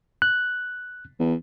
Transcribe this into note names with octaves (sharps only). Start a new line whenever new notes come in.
F#6
E2